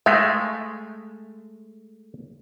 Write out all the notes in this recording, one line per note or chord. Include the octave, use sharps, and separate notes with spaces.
G#3 A3 E5 F5 G5